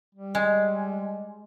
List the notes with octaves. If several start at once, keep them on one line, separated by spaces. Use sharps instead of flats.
G3
G#3